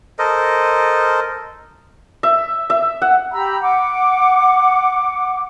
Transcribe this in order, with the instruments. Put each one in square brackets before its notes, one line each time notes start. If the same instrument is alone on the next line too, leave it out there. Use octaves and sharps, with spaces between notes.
[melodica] A4 A#4 C5 D#5
[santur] E5
E5
F#5
[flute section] G4 A#5 B5 E6
F#5 D6